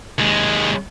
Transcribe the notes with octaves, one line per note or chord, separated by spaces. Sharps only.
D#2 G#3